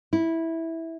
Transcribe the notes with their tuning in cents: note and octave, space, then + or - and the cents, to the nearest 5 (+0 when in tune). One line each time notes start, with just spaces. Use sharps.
E4 -10